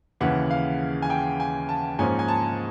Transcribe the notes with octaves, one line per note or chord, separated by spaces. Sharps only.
D#2 C#3 E3 F#5
F5
G#5
G5
G#5
A5
G#2 F3 A#3 C#4 G#5
G#5
A5